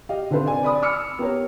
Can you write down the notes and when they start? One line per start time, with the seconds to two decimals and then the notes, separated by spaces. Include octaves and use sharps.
0.09 G4 D#5 F5
0.31 D3 C4 D4 A4 B4 C5
0.47 D5 G#5
0.63 D5 B5 D#6
0.82 B5 D6 E6 F6 C#7
1.19 B3 G4 A#4 C#5